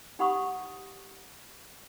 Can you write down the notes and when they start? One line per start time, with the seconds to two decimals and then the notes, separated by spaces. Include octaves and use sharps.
0.19 D#4 G4 F#5 B5 C#6 D#6